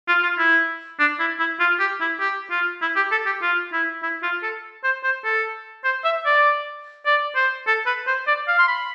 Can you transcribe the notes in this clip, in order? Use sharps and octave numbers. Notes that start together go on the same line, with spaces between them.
F4
F4
E4
D4
E4
E4
F4
G4
E4
G4
F4
E4
G4
A4
G4
F4
E4
E4
F4
A4
C5
C5
A4
C5
E5
D5
D5
C5
A4
B4
C5
D5
F5
C6
B5